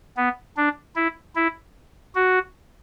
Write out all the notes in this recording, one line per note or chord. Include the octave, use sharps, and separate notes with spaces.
B3
D4
E4
E4
F#4